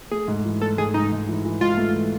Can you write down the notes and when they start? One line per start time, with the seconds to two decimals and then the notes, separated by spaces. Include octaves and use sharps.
0.11 A3 G#4
0.28 G#2
0.45 E3
0.61 A3 A4
0.78 G#2 G#4
0.94 G#2 D#4
1.12 G#2
1.28 E3
1.45 E3
1.61 G#2 F4
1.78 A3
1.94 E3